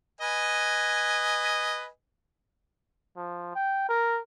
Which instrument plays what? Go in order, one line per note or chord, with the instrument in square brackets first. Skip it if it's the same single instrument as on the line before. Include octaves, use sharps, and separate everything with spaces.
[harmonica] B4 D#5 G#5
[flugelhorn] F3
G5
A#4